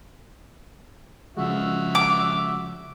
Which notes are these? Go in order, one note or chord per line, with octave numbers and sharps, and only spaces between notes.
C#3 F3 G#3 F#4 E5
D6